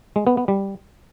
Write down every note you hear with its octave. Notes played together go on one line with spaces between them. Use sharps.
G#3
B3
B3
G3